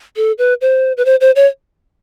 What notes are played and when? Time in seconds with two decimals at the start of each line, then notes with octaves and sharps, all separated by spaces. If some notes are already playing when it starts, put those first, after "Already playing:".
0.16 A4
0.38 B4
0.61 C5
0.97 B4
1.05 C5
1.21 C5
1.36 C#5